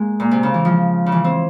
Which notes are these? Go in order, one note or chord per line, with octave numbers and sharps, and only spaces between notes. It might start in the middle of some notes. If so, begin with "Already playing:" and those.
Already playing: G#3 A#3
A#2
C3
C#3
E3
F3
C#3
E3
C4